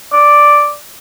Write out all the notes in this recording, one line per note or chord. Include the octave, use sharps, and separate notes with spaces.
D5